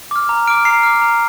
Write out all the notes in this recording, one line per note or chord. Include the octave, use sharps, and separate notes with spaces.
D6 F6
A#5
D6 F6 D7
A#5 C7
D6 F6
A#5